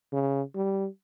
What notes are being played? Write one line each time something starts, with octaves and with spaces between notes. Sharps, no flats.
C#3
G3